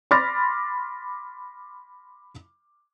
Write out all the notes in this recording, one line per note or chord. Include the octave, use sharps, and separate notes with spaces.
B5 C6 D6 F6 A6 A#6